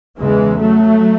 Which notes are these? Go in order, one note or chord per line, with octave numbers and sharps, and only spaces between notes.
E2 C#3 E3 G#3
F#3 A3